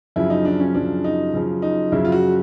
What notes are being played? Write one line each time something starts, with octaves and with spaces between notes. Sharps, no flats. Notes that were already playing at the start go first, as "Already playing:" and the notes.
F#2 C#3 F3 E4
D#4
D4
C#4
F#2 C#3 F3 D4
D#4
F#2 C#3 F3
D#4
F#2 C#3 F3 E4
F4
F#4